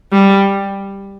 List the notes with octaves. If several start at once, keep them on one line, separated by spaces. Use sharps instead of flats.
G3